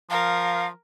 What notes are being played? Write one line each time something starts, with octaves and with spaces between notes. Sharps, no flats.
F3 A#4 F5